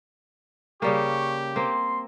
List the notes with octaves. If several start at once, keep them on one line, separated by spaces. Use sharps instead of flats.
C#3 G3 A#3 G4 C#6
A#3 C4 C6